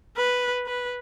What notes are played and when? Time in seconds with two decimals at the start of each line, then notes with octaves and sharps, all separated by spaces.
0.17 B4
0.66 B4